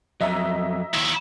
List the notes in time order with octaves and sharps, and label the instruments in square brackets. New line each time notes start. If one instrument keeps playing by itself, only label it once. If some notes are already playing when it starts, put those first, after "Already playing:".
[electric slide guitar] F2 F#3 [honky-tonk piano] D#5 E5 A#5
[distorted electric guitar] D#2 E4